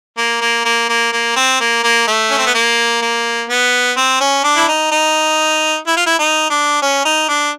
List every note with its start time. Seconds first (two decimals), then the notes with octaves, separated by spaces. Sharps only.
0.17 A#3
0.41 A#3
0.65 A#3
0.89 A#3
1.13 A#3
1.36 C4
1.60 A#3
1.83 A#3
2.08 A3
2.31 C#4
2.39 C4
2.47 B3
2.54 A#3
3.02 A#3
3.49 B3
3.97 C4
4.21 C#4
4.44 D4
4.56 E4
4.68 D#4
4.91 D#4
5.87 E4
5.96 F4
6.06 E4
6.19 D#4
6.50 D4
6.82 C#4
7.05 D#4
7.29 D4